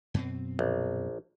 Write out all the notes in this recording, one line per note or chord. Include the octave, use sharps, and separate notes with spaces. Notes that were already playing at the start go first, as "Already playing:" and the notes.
F#2 B2 C4
A#1